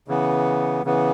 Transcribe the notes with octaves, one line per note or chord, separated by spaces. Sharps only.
C#3 E3 B3
C#3 E3 B3